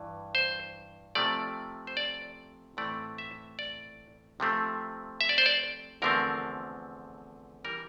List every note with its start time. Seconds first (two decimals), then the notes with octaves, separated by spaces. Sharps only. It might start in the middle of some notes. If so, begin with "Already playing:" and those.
Already playing: G2 E3
0.35 C5
1.15 C3 F3 A3 D5
1.87 C5
1.97 D5
2.77 A2 E3 A3 C4 D5
3.18 E5
3.59 D5
4.40 C3 F3 A3 C4
5.21 E5
5.29 D5
5.38 C5
5.46 D5
6.02 E2 D3 F3 A3 C4 A#4
7.64 E3 G3 A#4